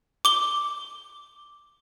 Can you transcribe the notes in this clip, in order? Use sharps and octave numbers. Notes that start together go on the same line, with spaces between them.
D6 G7